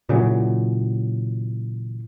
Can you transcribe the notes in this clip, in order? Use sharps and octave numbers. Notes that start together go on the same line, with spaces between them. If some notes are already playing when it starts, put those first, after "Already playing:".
A#2 C#3 E3 F#3